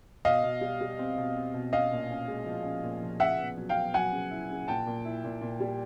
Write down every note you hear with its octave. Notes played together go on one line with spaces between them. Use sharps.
B2 D#5 F5
B2
G3
G3
C4
B2
C4
B2
C#4 D#5 F5
A#2
C#4
G#3
F3
C#4
A#2
F3
C#3 E5 F#5
B3
F#3
F5 G5
B3
F#3 F#5 G#5
C#3
E4
C#3
A#2 G5 A5
A#2
E4
A#2
A#2
G3